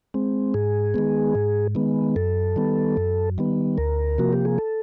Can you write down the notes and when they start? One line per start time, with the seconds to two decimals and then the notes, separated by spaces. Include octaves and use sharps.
0.14 G#3 C4
0.54 G#2 G#4
0.94 D#3 G#3 B3
1.35 G#2
1.75 D#3 G#3 B3
2.16 F#2 A4
2.56 D#3 G3 B3
2.97 F#2
3.38 D#3 G3 B3
3.78 D2 A#4
4.18 C3 F3 A#3 F#4
4.33 G4
4.45 G#4
4.58 A4